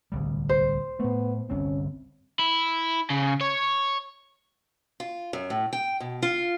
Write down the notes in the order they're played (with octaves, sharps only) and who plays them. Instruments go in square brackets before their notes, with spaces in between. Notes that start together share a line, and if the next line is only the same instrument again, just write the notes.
[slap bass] D1 C2 G3
[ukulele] C5
[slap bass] A2 A3 [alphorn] B3
[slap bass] G1 C2 C4 [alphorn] C#4
[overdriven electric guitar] E4
C#3
C#5
[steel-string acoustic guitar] F4
F#2
A2
G5
B2
F4